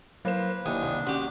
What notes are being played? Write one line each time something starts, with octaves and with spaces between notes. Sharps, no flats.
F#3 A#3 B4 C5 E7
D#2 D4 E4 G#5 D#6
C2
C#4 F#4 G4